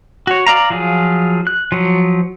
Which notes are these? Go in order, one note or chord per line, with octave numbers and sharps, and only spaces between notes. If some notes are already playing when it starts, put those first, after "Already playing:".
F#4 C#5
D5 F5 A#5
F3 F#3 F4 G#4
F#6
F3 F#3